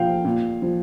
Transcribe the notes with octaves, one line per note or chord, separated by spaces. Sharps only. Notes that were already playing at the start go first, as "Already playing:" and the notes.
Already playing: A#2 F3 F5 G5
A#2
F3